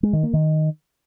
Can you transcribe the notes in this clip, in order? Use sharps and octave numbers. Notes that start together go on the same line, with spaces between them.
G#3
D#3
A#3
D#3